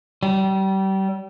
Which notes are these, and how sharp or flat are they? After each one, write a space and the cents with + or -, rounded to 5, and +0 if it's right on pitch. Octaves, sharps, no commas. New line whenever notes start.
G3 -30